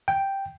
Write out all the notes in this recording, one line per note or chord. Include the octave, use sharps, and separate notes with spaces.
G5